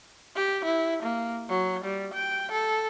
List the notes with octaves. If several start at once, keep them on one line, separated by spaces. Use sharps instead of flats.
G4
E4
A#3
F#3
G3
G5
A4